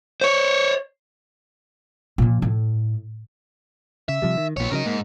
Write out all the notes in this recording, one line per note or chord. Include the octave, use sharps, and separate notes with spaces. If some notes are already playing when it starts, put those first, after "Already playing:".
C5 C#5
A#2 F3
A2
C#3 E5
C3 F3 G3
D#3
A#1 A#2 B3 C#5
C#3 F3 F#3 A#4 D#5
G#2 A#3